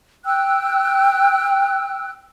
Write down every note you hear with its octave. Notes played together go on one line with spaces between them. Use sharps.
G5 E6 F#6